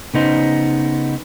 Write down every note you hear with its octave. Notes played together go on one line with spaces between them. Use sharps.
C#3 B3 D#4 C5